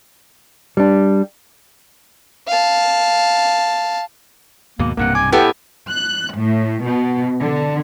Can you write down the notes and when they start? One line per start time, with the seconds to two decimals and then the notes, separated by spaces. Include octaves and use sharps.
0.77 G3 D4
2.48 F5 A5
4.79 D#2 G#2 B2 A#3
4.97 B1 G2 C3 A#3 F#5
5.15 G#5 D6
5.32 A2 B3 E4 G4 A4 G5 G#5
5.90 F#6
6.37 A2
6.84 B2
7.41 D3